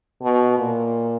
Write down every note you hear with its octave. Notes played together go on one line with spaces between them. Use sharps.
B2
A#2